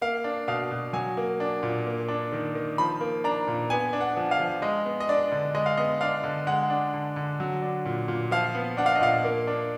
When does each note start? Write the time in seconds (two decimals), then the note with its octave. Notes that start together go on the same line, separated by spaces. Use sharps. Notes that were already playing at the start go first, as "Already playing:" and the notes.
0.02 A#3 F5
0.24 D4
0.48 B2 F5
0.71 B2
0.93 F#3 G#5
1.17 A#3
1.40 D4
1.63 A#2
1.86 A#3
2.08 D4
2.32 D#3
2.55 D#3
2.78 F3 B5
3.01 A#3
3.24 D4 A#5
3.48 A#2
3.70 B3 G#5
3.93 D4
4.01 F#5
4.17 F3
4.31 F5
4.39 F3
4.62 G#3 D#5
4.85 B3
5.00 D#5
5.09 D4 D5
5.32 D3
5.54 G#3 D#5
5.66 F5
5.77 B3 D#5
6.01 D4 F5
6.23 D3
6.47 G#3 F#5
6.70 D4
6.94 D3
7.16 D3
7.40 F#3
7.62 D4
7.86 A#2
8.08 A#2
8.31 F3 F5
8.55 B3
8.77 D4 F#5
8.86 F5
8.95 D#5
9.01 A#2 F5
9.24 A#3
9.47 D4